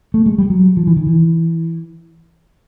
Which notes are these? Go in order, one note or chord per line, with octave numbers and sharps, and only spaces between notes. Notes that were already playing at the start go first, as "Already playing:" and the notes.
A3
G#3
G3
F#3
F3
E3
D#3
E3